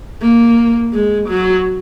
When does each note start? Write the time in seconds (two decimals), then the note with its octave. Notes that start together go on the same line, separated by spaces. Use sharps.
0.22 A#3
0.93 G#3
1.28 F#3